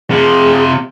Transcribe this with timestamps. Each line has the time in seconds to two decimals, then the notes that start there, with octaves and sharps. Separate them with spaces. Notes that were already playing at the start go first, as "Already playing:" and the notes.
0.11 C3 F4 G#4